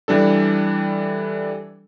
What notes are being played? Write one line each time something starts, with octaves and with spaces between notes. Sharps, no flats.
E3 G3 D4 A4